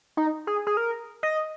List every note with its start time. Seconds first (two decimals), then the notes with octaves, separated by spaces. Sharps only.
0.17 D#4
0.47 G#4
0.67 G#4
0.77 A#4
1.23 D#5